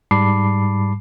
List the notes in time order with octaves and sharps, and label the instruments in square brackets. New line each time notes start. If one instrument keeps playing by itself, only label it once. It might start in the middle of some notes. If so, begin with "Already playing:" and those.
[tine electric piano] G#2 G3 A5 B5 D6 C7